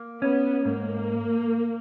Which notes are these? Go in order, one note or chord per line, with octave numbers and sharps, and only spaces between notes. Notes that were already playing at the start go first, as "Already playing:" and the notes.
Already playing: A#3
B3 C#4
G#2 A#3